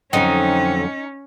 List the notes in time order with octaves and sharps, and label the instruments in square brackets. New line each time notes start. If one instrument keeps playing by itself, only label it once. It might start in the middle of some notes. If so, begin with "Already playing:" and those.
[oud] F2 D3 F#3 [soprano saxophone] C4 [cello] C#4 [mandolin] D#4